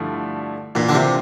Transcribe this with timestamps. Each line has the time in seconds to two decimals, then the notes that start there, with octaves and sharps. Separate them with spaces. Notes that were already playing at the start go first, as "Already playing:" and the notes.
Already playing: G2 D3 F3 A3 E4
0.75 A#2 E3 A#3 D4 F4
0.89 D3
0.94 C3